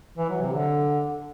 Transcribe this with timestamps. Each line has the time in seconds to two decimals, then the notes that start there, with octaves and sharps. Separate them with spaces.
0.17 E3
0.29 F#3
0.41 C3
0.53 D3